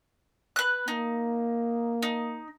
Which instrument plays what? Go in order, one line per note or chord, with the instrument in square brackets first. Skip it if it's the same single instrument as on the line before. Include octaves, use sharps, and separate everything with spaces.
[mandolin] B4 F#6
[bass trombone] A#3 [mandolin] D#4
[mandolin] D#4